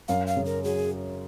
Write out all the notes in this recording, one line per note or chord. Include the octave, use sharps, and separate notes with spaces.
F#2 F5
F5
C#3
A#4
F#3 G#4